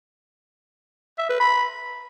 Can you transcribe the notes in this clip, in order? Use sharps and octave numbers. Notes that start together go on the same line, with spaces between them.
E5
B4
B5